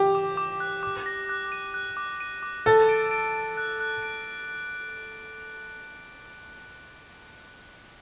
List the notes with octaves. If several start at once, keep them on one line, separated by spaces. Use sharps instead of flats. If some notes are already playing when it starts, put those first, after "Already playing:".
Already playing: G4
D6
D6
F#6
D6
A#6
F#6
D#7
F#6
D6
D#7
D6
A4 A6
D7
D7
D7
F#6
F#6
D7